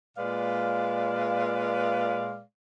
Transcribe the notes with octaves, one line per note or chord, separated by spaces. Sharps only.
A#2 G#3 B4 D5 F5